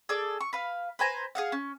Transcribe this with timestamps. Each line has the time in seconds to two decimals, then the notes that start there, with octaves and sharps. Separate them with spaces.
0.09 G#4 A4 D5
0.41 C#6
0.53 B4 F5
0.99 B4 C5 G#5 A#5
1.35 G#4 F5 F#5
1.52 C#4